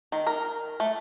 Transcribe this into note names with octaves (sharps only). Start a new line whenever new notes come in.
D#3
A#4
A3